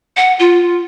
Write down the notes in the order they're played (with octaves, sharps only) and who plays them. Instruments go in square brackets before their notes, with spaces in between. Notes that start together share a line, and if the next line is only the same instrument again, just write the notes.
[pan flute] F#5
F4